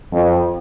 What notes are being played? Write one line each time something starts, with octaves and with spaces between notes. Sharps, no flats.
F2